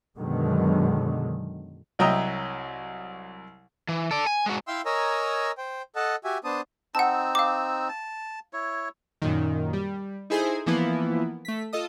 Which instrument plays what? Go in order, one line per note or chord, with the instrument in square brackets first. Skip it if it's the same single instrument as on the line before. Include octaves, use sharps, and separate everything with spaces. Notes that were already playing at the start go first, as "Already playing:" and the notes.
[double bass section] F#2 B2 D3 D#3 F#3 G#3
[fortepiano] C2 F#3 D#5 E5 G5 A#5
[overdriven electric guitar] E3
A4 D5
G#5
G#3 F#4
[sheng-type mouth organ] E4 E5 F5 G5 C6 E6
A#4 C#5 D#5 G#5 A#5 E6
C5 G5
A4 D#5 F#5 A5
F#4 G4 E5 G#5
B3 D4 C5 A5 D#6
[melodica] C4 D#4 E6 [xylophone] F#5 A5
[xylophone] F5 D6
[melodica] A5
E4 C#5
[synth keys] F#2 A#2 D#3
G3
D#4 E4 G#4 A4 C5 G#5
E3 F3 A#3 B3 E4
A3 B6
F4 A4 D#5 D#6